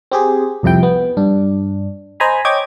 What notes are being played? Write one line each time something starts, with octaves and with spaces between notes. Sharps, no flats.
C4 G4 G#4
C2 F2 C3 E4 G5
B3
G2 D4
C5 D#5 G#5 A#5 B5
C#5 D#5 G5 D6 G#6